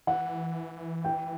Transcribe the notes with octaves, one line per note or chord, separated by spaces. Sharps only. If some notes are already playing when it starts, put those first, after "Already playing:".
E3 F#5
G5